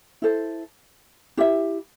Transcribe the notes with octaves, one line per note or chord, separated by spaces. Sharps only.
E4 A4 C5
E4 G4 E5